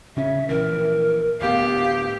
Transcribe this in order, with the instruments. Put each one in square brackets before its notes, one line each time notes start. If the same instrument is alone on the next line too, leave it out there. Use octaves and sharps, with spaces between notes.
[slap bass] C#3 C#4 [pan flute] E5
[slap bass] A#1 E3 [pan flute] A#4
[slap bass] D1 D2 B3 [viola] G4 [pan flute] F5